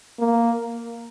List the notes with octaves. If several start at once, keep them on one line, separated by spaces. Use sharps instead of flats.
A#3